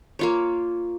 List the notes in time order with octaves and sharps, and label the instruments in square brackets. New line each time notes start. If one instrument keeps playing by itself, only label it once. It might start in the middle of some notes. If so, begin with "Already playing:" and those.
[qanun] A#3 F4 C#5